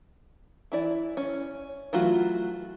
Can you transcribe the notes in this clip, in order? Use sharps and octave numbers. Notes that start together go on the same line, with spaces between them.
E3 E4 D5
C#4
E3 F#3 A3 F4 F#4